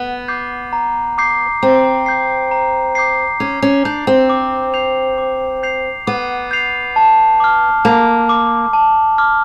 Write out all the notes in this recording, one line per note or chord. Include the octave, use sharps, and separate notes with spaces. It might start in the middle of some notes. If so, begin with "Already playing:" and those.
Already playing: B3
D6 G6 C7
A#5
D6 G6 C7
C4 A#5
D6 G6 C7
A#5
D6 G6 C7
C#4 D6
C#4
D4 G6 C7 F7
C4
D6
G6 C7 F7
D6
G6 C7 F7
B3 D6
G6 C7 F7
A5
D6 F6
A#3 A5
D6 F6
A5
D6 F6